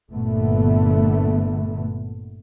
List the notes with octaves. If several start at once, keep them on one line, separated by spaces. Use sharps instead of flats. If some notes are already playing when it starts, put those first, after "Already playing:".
G1 A#2 D3 A3 B3